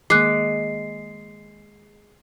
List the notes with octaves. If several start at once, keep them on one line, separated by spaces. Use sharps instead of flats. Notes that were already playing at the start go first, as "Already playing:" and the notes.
D#3 G#3 A#3 D6 F#6 C7